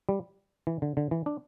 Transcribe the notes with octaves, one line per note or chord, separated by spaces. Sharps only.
G3
E3
D3
D3
E3
D4